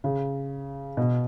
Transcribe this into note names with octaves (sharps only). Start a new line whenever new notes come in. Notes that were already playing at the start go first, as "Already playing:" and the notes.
C#3
B2